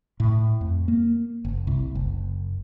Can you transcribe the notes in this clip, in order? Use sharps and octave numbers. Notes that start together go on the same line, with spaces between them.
A2
F2
A#3
F#1
C2
F#1